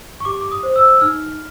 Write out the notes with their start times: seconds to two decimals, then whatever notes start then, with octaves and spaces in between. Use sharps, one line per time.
0.20 C#6
0.25 G4 D6
0.41 D6
0.52 D#6
0.63 C5
0.76 E6
1.01 D#4 F6